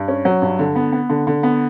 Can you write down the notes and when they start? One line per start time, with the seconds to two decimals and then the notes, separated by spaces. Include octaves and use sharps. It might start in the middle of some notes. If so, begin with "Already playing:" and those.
Already playing: G2
0.08 C#4
0.25 F#3
0.42 G2
0.59 D3
0.76 B3
0.92 B3
1.09 D3
1.27 D3
1.43 B3